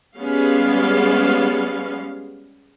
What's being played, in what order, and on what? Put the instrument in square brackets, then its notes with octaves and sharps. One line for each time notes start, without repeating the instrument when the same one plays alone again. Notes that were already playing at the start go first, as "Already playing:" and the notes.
[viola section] G3 G#3 B3 C#4 F5